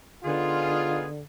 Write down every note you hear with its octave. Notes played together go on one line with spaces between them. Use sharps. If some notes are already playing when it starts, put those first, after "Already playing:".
D3 B3 D#4 F4 G#4